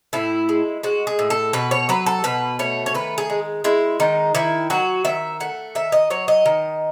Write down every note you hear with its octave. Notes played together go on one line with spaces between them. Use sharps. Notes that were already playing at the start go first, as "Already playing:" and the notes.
A2 E4
G#3
G#3 F#4
G#4
A2
A4
B2 B4
C#5
F#3 B4
A4
B2 B4
A3 C#5
C#5
D#3 B4
G#4
G#3
G#3 E4
D#3 D#4
D#3 E4
F#3 F#4
D#3 E5
A3 F#5
D#3 E5
D#5
F#3 C#5
D#5
D#3